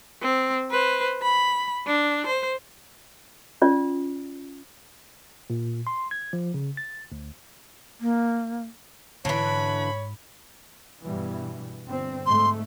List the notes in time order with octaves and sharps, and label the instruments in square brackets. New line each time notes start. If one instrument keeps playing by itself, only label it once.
[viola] C4
B4 C5
B5
D4
C5
[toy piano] C#4 F4 D5
[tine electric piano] A#2
C6
G#6
F3
C#3
A6
D2
[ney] A#3
[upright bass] G#2 [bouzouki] D3 E3 [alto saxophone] C#5 [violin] B5
[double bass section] G2 B2 E3
G1 C4
[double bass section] G#2 A3 [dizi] C6